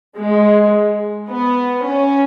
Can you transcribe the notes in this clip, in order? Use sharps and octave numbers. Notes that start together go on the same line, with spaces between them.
G#3
B3
C#4